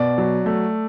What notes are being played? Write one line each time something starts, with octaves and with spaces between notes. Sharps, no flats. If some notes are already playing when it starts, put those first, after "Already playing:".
Already playing: B2 D5
F#3
A3